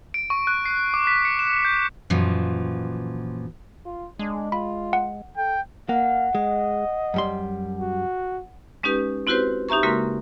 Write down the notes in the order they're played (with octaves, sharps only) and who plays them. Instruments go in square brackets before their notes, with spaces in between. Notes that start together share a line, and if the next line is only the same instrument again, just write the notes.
[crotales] D7
C#6
F#6
C7
D6
B6
C#7
E7
G6
[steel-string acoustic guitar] F#2 A#2 E3 F3
[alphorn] F4
[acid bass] G#3 [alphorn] D4
[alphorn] F4 [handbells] B5
[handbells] F#5
[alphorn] A4 [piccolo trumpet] G5
[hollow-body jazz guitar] A#3 [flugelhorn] F5 [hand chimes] F#5
[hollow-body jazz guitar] G#3 [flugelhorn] D#5
[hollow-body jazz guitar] F#2 G3 C6
[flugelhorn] F#4
[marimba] G#3 C#4 D#4 G4 B4
C4 E4 F#4 G4 B4 C5
D#4 G4 E5 A#5 C#6
C#3 G#3 A#3 F#4 A#4 C6